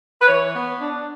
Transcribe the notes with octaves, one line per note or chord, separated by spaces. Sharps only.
B4
E3 C#5
B3
D4